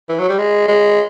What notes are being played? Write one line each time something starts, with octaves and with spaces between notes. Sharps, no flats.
E3
F#3
G3
G#3
G#3